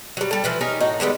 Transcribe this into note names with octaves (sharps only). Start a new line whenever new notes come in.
F#3 G3
G3 A4
E3 F3 B4
C#4 D#4 G4 A#4
A2 F#3 D#4
D3 G3 G#3 B3